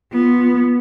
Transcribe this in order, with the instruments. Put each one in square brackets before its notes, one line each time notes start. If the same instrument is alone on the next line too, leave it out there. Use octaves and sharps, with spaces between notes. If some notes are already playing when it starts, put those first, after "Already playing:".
[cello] B3 [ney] F4